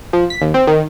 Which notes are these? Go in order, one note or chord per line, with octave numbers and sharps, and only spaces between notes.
F3
B6
D#2
C4
D#3